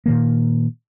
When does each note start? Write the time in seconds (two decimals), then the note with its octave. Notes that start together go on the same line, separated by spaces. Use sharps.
0.06 A#2 D#3 A#3